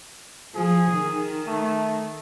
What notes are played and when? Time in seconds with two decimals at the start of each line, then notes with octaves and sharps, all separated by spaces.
0.55 F3 G#4
0.92 D#3
1.47 A3